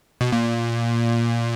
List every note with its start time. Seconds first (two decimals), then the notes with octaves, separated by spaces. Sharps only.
0.21 B2
0.33 A#2